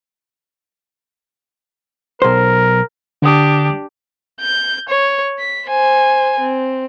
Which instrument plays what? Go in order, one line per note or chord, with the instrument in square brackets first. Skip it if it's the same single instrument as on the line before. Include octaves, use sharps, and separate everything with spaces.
[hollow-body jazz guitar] B1 C5 [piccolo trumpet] A#4
[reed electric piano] D3 D#6 [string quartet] D4 G4
[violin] G6
C#5
B6
C5 G#5
C4